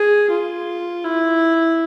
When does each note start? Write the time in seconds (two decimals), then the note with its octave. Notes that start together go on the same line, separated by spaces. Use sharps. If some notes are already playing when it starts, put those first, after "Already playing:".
Already playing: G#4
0.30 F4
1.04 E4